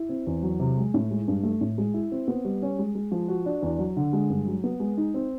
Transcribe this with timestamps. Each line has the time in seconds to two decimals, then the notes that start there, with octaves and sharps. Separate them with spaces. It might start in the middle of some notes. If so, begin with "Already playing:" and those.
Already playing: E4
0.09 C4
0.27 E2
0.42 F#3
0.60 C3
0.77 G#3
0.94 A2
1.11 G#3
1.28 G2
1.43 A3
1.61 A2
1.78 G#3
1.94 E4
2.12 C4
2.28 B3
2.45 G3
2.62 C#4
2.79 G#3
2.95 G#3
3.12 F3
3.28 F#4
3.46 D4
3.63 E2
3.79 F#3
3.97 D3
4.13 G#3
4.30 G2
4.46 F#3
4.64 B3
4.80 G#3
4.97 D#4
5.14 C4